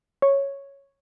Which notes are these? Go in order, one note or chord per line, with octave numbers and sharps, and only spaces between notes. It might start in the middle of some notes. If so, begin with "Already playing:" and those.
C#5